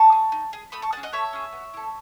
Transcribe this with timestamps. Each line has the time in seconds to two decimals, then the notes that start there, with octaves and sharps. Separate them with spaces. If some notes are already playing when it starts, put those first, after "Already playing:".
Already playing: A5 C#6
0.12 G#4
0.32 D#4
0.53 G#4
0.72 A3 B5 D#6
0.82 A5 C#6
0.93 C#4 G#4 F#5 A5
1.03 D#5 F#5
1.12 A3 C#5 E5
1.33 C#4 G#4
1.53 B3
1.74 E4 A4